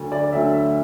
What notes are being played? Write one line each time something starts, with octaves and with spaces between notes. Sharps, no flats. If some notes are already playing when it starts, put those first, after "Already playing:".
Already playing: D2 D3 F#3
D5
D2 D3 F#3 E5
E5